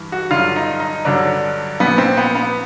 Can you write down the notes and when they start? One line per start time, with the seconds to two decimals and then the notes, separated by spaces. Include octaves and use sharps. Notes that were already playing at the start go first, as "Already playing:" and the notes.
Already playing: G2 E3
0.12 F#4
0.30 G2 D3 F#3 F4
0.56 D#4
0.80 D#4
1.05 G2 D3 F#3 D4
1.80 A#2 F3 B3
1.98 C4
2.17 B3
2.35 B3